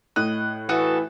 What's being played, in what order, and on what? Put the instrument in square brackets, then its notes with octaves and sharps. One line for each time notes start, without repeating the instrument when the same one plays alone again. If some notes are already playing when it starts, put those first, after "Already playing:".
[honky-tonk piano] A2 F#6 [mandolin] D#5
[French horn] E3 [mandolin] F#4 A4 D#6